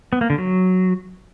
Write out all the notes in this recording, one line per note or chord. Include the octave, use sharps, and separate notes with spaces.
B3
A#3
D3
F#3